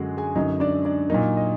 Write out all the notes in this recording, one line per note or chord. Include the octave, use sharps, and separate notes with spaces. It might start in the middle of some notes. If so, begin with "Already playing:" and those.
Already playing: F#2 D3 G#3 F#4
G#4 G#5
F#2 D3 F#3 D#4 D#5
D4 D5
D4 D5
A#2 F#3 A#3 D#4 D#5
D#5